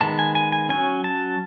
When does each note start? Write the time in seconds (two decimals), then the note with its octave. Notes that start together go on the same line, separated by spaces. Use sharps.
0.01 D#3 G#3 B3 A5
0.19 G#5
0.35 G#5
0.52 G#5
0.69 F#3 C#4 G#5
1.04 A5